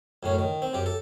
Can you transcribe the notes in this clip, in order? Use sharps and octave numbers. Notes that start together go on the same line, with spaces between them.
F#2 A2 C#4
D#3
C4
F#2 G4
A4